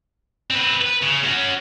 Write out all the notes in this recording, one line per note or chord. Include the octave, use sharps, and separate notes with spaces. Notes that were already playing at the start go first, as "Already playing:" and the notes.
C4 B4
B4
C#3
C#4 F#4